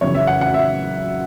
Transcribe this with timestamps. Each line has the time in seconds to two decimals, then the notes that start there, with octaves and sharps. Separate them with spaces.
0.01 F#2 C#3 E3 C#5
0.15 E5
0.27 F#5
0.41 F#5
0.54 E5